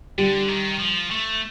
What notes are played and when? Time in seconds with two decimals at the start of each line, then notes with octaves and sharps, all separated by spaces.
0.18 D3 G3
0.48 D#3
0.79 F3
1.11 A3